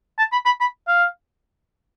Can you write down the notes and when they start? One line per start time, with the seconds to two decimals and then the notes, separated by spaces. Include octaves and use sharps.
0.18 A5
0.32 B5
0.45 B5
0.60 B5
0.88 F5